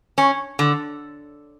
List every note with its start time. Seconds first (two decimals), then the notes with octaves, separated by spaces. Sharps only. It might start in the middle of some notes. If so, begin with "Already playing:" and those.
0.18 C#4
0.59 D3